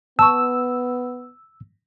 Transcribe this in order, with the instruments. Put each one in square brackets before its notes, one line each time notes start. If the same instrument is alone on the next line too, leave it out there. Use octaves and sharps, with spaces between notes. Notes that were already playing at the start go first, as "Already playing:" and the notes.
[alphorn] B3 [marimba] A5 C#6 [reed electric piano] E6